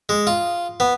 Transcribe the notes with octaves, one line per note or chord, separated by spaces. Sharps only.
G#3
F4
B3